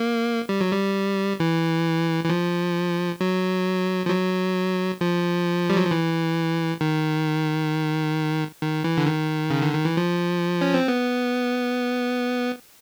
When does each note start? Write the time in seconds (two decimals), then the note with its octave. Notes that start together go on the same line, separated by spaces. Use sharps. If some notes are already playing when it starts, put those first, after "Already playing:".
Already playing: A#3
0.49 G3
0.60 F#3
0.71 G3
1.40 E3
2.24 E3
2.29 F3
3.21 F#3
4.06 F3
4.10 F#3
5.01 F3
5.70 G3
5.77 F#3
5.85 F3
5.91 E3
6.81 D#3
8.62 D#3
8.84 E3
8.97 D3
9.07 D#3
9.50 C#3
9.62 D3
9.74 D#3
9.85 E3
9.97 F3
10.61 C#4
10.74 C4
10.88 B3